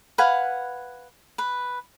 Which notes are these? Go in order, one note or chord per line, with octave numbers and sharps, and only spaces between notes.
B4 F5 F#5 G#5
B4